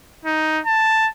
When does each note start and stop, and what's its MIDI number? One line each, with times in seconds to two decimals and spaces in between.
0.25 0.60 63
0.66 1.08 81